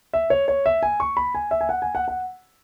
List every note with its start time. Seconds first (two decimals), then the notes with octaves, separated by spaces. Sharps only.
0.13 E5
0.30 C#5
0.48 C#5
0.66 E5
0.83 G#5
1.00 C#6
1.17 B5
1.35 G#5
1.51 E5
1.61 G#5
1.69 F#5
1.82 G#5
1.95 F#5
2.08 F#5